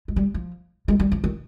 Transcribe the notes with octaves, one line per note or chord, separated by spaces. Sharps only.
G#3
G3
F3
G#3
G3
F3
D#3